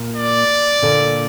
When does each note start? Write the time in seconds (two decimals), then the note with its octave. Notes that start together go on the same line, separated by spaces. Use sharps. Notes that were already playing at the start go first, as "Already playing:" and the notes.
Already playing: A#2
0.16 D5
0.82 A#2 D3